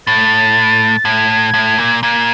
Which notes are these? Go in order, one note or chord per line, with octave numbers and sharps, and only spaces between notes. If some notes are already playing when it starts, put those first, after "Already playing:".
A2 A6
A2 G#6
A2
A#2
A#2 G#6